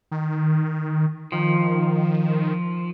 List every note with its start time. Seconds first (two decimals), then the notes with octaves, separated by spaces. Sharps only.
0.11 D#3
1.32 D#3 F3